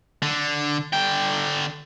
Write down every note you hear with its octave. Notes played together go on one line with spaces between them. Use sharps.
D3
D3 G5